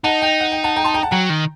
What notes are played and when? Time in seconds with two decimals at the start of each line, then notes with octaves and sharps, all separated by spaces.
0.04 D#4 F#5 A5
0.22 G5
0.40 F#5
0.52 G5
0.64 F#5 A5
0.76 G5 A#5
0.84 A5 C6
0.94 G5 A#5
1.03 F#5 A5
1.11 F#3 G5 A#5
1.30 D#3